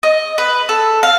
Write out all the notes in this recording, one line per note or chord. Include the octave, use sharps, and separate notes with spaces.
D#5
B4
A4
F5